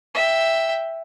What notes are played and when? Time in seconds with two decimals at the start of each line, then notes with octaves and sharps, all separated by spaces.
0.14 E5 G5